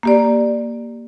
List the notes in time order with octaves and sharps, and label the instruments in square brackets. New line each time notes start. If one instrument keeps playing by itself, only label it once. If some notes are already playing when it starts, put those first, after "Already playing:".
[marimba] A#3 G4 D5